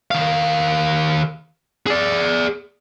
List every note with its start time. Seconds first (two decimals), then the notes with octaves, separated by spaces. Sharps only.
0.11 D#3 F5
1.87 G#4 D5